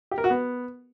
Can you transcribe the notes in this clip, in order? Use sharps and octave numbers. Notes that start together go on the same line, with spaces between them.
G4
A#4
F#4
B3